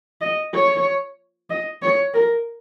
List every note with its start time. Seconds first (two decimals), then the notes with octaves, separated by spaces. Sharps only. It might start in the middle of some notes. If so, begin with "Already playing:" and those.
0.21 D#5
0.53 C#5
1.50 D#5
1.82 C#5
2.14 A#4